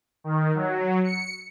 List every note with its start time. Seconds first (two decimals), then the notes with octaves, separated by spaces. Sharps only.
0.24 D#3
0.55 F#3
1.04 C#7